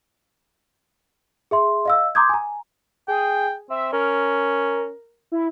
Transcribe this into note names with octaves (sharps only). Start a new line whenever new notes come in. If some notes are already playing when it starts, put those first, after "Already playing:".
G#4 E5 C6
D#5 F5 E6
A#5 C6 D6 D#6 G6 G#6
G#5 A#5
G#4 G5
C4 E5
C#4 A#4
E4